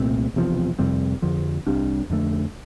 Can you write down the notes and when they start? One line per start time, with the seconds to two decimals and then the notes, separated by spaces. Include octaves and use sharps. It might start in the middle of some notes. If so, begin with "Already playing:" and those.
Already playing: C2 A#2 A3 C4
0.34 E1 E2 C3 F3
0.79 F2 C3 G3 C4
1.22 F2 D3 F3
1.67 C2 C3 G3 D4
2.10 F2 D3 A3